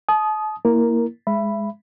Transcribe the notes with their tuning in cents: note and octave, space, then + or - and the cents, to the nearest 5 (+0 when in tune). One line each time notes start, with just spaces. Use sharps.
A5 -40 D#6 +0
A#3 +0 E4 -5 A#4 +0
G#3 +0 E5 +25 B5 +0